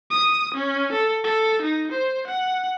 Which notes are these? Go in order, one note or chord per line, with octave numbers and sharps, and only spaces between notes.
D#6
C#4
A4
A4
D#4
C5
F#5